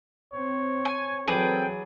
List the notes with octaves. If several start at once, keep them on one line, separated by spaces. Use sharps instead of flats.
C4 C#5
G#5
E3 F#3 C4 G#4 A4 B4 D5 G5